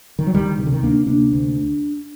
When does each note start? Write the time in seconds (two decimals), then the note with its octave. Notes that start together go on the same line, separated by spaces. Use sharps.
0.19 D#3
0.27 F#3
0.34 D2 D#3 G3
0.58 C3 D#3
0.66 D3
0.72 D#3
0.83 D2 A#3 D4
1.07 C3 A#3 D4
1.32 D2